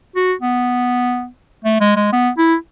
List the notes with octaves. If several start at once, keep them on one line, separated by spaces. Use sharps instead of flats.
F#4
B3
A3
G#3
G#3
B3
E4